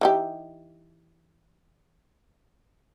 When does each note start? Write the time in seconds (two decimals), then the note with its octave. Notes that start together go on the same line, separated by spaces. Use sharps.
0.01 E3 D#4 G4